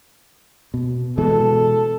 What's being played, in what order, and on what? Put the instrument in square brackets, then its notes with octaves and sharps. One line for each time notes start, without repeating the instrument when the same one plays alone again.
[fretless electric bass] B2
[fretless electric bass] B2 E3 G#3 [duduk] A4